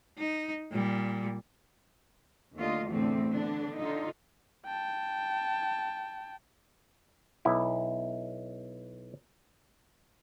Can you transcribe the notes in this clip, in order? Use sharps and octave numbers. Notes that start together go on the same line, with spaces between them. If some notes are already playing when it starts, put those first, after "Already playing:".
D#4
A#2 G3
D#2 D3 A3 F4 D#5
E2 A2 D3 A3 C4
D3 B3 D4
D3 D#4 F4
G5 A5
B1 E4